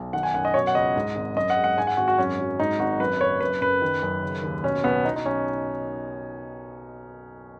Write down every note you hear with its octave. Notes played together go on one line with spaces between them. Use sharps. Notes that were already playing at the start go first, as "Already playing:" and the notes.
Already playing: B1
D#3 F#5
G#5
F#2 F#5
D#5
B2 C#5
F#5
C#2 D#5
G#2
G#1
F#2 D#5
F#5
G#3
F#5
G#2 G#5
F#5
G#1 F#4
F#4
F#2 C#4
F#3
G#2 D#4
G#1 F#4
F#2 B4
F#1 C#5
F#2 B4
F#1 B4
D#3
F#2
C#3
D#2
B2 C#4
B1 B3
B2 D#4
D#4
B1 C#4